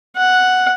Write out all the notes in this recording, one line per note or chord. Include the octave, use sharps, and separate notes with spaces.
F#5